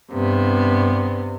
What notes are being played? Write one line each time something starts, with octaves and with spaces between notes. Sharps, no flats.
G2 C3 B3